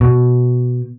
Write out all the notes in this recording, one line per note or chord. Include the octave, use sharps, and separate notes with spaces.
B2